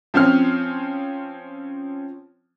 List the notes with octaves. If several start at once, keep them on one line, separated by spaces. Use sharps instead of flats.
F3 C4 C#4 F6